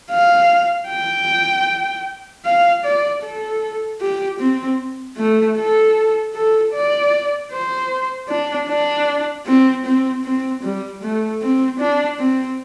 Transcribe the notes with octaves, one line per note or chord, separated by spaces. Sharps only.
F5
G5
F5
D5
A4
G4
C4
A3
A4
A4
D5
C5
D4
D4
C4
C4
C4
G3
A3
C4
D4
C4